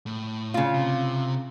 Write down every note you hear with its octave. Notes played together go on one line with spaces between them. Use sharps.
A2
C#3 F4
C3